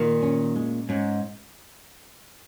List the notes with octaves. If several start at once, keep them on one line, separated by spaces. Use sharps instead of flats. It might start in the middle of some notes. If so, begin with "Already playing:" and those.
Already playing: A#2 D#3
C#4
G#3
G#2 C#4